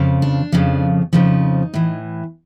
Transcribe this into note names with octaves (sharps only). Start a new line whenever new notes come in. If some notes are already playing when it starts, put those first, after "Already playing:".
Already playing: F2 C#3 F3
D4
F2 C#3 F3
F2 C#3 F3 D#4
A2 E3